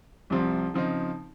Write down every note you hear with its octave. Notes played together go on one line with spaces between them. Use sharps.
C2 C3 F3 C4
C#3 F3 C4 D#4